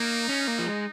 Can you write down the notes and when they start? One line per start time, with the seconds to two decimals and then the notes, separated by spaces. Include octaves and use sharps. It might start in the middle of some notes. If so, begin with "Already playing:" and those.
Already playing: A#3 D#4
0.29 C#4
0.47 A#3
0.59 F3
0.66 G#3